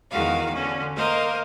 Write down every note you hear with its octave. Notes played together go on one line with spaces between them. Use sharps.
E2 D#3 G#3 F#4 F5
D3 C#4 F#4
A#3 A#4 C5 D#5 F5